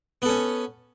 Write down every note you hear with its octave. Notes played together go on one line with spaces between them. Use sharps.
B3 C#4 A4